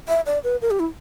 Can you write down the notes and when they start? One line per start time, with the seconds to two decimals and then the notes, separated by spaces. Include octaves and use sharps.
0.08 E5
0.26 D5
0.44 B4
0.62 A#4
0.71 G4
0.80 E4